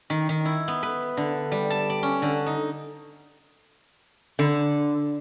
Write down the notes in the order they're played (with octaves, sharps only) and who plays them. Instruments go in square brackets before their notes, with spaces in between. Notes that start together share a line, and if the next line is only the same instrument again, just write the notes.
[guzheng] D#3
D#3
E4
B3
B4
D3
G3
A5
D5
C#4
D3
D#4
[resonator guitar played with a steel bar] D3